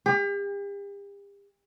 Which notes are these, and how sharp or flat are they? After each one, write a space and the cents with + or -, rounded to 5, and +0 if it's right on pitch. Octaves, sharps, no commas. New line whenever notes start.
G4 +40